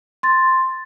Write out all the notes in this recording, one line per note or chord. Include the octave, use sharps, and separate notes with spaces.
C6 A6